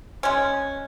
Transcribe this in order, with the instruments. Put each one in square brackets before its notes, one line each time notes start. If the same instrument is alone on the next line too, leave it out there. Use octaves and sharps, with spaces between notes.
[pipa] G#3 C#4